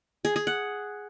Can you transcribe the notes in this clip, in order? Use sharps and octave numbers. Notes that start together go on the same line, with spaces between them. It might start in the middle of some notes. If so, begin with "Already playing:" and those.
G#4
G#4
F#5